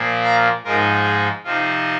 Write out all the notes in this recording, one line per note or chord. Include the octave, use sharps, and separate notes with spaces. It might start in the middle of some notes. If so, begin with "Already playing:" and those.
Already playing: A#2 F3 A#3
F5 A#5
G#2 F3 G#3 D#4 F4 A#4
G#4
C3 F3 C4 D#4 F4